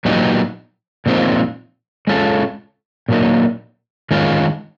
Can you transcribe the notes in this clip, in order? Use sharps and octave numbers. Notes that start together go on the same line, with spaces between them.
A#2 F#3 B3 D#4 G4
A#2 F3 G#3 C4 D#4
G#3 C#4 F4 A4
A#2 F#3 A#3 D#4
D#3 G#3 C#4 F4